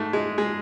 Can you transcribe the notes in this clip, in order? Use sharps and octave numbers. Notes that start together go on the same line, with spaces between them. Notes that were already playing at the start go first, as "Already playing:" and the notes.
Already playing: G#2 A3
G#3
G#3